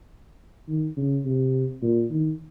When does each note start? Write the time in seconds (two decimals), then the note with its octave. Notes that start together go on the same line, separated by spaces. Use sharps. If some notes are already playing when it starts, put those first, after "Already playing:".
0.68 D#3
0.97 C#3
1.25 C3
1.82 A#2
2.10 D#3